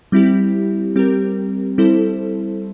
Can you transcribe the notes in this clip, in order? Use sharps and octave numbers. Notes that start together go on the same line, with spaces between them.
G3 C4 E4 G4
G3 C4 G4 A#4
G3 C4 E4 A4 C5